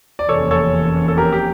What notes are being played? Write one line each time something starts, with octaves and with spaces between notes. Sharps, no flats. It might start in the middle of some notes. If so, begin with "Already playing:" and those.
D5
F1 E2 E3 A#3 C#4 A4 C#5
A4 C#5
A4
G4 A#4
G4